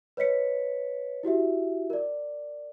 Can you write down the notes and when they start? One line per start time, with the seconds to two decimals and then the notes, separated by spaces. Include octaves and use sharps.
0.17 B4 C#5 D#5 B6 C#7
1.23 E4 F#4 G4 E5
1.90 A#4 D5